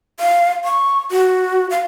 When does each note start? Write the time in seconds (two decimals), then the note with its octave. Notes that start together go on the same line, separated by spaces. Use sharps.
0.20 F5
0.65 C#6
1.11 F#4
1.70 F5